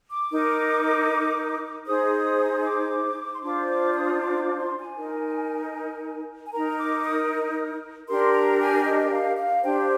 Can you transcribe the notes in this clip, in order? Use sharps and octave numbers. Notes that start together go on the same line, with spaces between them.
D6
D#4 A#4
D#4 G#4 C5 D#6
D6
C6
D4 F4 C5 D6
D6
D#6
D6
D6
C6
G#5
D#4 A#4
G#5
D#4 A#4 A#5
D6
D#6
D4 G4 A#4 C6
A#5
G#5
D#5
F5
F5
D4 G4 C5 G5